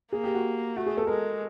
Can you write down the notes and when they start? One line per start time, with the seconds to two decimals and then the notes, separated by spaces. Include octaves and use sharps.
0.12 A#3 G#4
0.24 G4
0.35 F#4
0.77 A3 F#4
0.86 G#4
0.97 A4
1.07 G#3 A#4